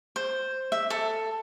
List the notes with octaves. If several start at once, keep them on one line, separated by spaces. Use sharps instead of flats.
C5
E5
A4